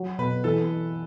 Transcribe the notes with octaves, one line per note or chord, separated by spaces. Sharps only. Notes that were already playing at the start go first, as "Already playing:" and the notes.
Already playing: F#3
B2 B4
E3 A4